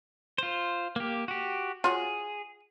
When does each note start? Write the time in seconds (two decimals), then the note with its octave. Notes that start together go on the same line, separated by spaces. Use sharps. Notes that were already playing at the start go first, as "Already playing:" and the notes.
0.38 F4 C5
0.96 A#3 G4
1.28 F#4 G4
1.84 F4 F#4 G#4 C#5